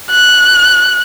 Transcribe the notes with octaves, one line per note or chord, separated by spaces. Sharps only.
F#6